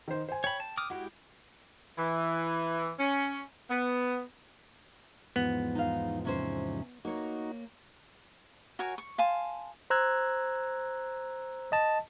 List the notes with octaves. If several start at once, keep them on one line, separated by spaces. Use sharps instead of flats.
D#3 C5
C5 G#5
C#5 G5 B5
A5
D6 D#6 F6
G#3 E4 F#4 G4
E3
C#4
B3
E2 G#2 F3 B3
D#4 F5
C3 C#4 C5
A#3 D#4 F#4 C#5
F#4 A#4 C#5 G#5
C#6
F5 G#5 A5 C6
C5 A#5 E6 F#6 G#6
D#5 A5